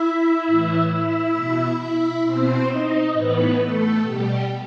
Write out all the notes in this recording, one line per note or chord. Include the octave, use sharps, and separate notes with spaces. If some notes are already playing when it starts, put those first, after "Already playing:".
Already playing: E4 E5
A2 E3
E4 E5
B2
E4 E5
B2 C4 C5
D#4 D#5
A2 E3 B3 B4
A3 A4
B2 G3 G4